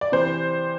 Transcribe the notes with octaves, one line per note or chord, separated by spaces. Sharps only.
D5
C3 E3 C5